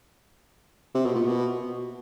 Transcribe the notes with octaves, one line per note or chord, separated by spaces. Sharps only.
C3
B2
A#2
B2